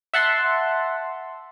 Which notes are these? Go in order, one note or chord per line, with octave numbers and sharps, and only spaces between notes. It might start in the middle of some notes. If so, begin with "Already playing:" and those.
E5 F#5 A5 C6